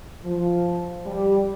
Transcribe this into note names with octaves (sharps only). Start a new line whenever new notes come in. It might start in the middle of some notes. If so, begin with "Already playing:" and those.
F3
G3